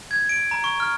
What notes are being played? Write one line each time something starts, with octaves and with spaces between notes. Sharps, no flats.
G#6
D7
A#5
C#6
F6